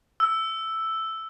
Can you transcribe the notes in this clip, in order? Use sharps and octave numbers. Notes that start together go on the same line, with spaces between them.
E6